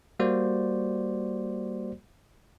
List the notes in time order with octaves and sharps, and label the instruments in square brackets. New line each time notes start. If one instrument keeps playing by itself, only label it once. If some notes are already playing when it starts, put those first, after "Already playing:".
[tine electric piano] G3 A#3 F#4 C5 D5